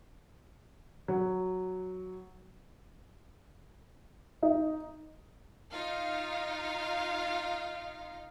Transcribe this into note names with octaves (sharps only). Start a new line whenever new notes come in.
F#3
D#4
D#4 F4 F5